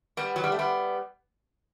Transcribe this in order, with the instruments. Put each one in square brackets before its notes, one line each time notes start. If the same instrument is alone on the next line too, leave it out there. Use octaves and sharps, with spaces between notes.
[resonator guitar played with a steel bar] G3 B3
F#3
G3
A3
G3 B3